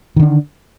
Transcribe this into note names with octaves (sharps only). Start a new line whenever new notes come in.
D3 D#3 D4